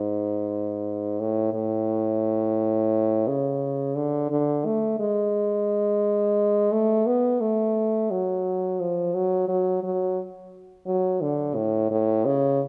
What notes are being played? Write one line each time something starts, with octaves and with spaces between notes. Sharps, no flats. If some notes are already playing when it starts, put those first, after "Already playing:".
Already playing: G#2
A2
A2
C#3
D3
D3
A3
G#3
A3
B3
A3
F#3
F3
F#3
F#3
F#3
F#3
D3
A2
A2
C#3